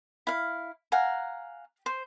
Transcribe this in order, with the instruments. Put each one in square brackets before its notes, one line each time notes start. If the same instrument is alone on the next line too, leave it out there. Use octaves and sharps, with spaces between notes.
[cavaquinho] E4 F5
F5 F#5 G#5 A#5
C5